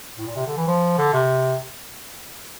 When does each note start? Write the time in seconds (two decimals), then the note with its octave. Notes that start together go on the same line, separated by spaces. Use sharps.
0.18 A2
0.27 A#2
0.36 C3
0.47 D3
0.57 E3
0.68 F3
0.98 D3
1.14 C3